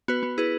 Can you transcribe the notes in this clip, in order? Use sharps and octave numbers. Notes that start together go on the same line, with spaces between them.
B3 F#4 B4
B3
E4 G#4 B4